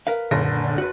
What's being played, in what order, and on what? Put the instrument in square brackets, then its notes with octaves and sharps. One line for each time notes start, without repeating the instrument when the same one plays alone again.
[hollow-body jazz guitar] A#4 B4 F5
[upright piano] F#1 A#6 [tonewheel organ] A#2 [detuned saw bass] D3
[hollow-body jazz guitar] F#4 B4